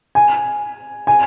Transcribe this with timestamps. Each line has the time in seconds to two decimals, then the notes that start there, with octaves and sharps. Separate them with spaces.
0.15 G#5
1.07 G#5